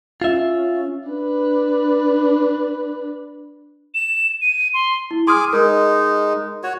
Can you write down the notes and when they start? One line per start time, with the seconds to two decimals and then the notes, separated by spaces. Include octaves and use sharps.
0.22 C#4 F4 E5
1.09 D4 B4
3.94 E7
4.42 D#7
4.74 C6
5.11 E4
5.27 G#4 G#5 C6 D6 D#6 F6
5.53 G#3 D#4 A#4
6.63 F#4 C#5